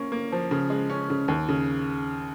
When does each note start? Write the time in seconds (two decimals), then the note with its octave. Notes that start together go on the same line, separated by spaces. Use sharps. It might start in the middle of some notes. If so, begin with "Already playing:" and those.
Already playing: A#3 C#4
0.12 A#3
0.32 F3
0.51 C#3
0.70 G#3
0.90 C#4
1.10 C#3
1.28 D#2
1.49 C#3